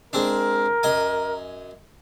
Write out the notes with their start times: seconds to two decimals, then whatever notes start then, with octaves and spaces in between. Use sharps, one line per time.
0.13 G#3 C4 D4 A#4
0.83 F#2 D#5 G#5